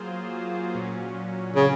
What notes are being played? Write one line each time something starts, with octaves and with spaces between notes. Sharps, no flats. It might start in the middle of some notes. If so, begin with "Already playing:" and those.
Already playing: F#3 A#3 F4 G#4 C5
A#2 F#3 C#4
C#3